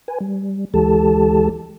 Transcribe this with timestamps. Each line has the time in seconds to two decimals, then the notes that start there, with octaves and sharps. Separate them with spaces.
0.08 B4 G#5
0.21 G3
0.74 D2 E3 G#3 G4 A4 A5